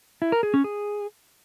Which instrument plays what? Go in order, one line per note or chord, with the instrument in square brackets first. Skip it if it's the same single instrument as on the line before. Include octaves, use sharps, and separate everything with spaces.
[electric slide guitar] E4
A#4
G#4
C#4
G#4